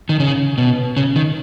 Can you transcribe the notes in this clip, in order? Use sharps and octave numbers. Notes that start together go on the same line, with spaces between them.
D#3
C#3
B2
C#3
D#3